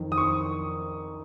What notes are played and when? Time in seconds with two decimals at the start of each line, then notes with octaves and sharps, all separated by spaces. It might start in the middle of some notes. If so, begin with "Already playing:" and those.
Already playing: F2 D#3
0.12 D#6
0.18 C#6